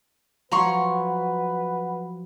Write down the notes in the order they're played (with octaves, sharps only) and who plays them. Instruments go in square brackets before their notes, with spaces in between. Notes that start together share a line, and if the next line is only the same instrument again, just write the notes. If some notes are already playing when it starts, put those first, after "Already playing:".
[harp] F3 F#3 [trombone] B4 [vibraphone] F#5 [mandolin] A#5 C6 C#6